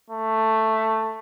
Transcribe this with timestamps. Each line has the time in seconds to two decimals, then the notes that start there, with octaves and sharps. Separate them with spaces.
0.11 A3